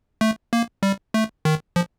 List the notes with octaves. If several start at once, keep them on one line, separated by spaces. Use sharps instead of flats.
A3
A#3
G3
A3
D#3
F3